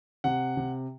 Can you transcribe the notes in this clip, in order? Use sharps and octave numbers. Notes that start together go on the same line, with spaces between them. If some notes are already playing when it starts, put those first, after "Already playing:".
C3 F#5
C3